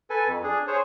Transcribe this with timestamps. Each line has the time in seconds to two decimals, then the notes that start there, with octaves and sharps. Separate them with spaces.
0.10 A4 B4 G#5
0.27 F2
0.44 D4 G#4
0.67 G#4 C5 C#5